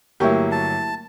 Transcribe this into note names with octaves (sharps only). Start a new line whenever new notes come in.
G1 F#3 A3 A#3 E4 G4 A#4 C#6
A5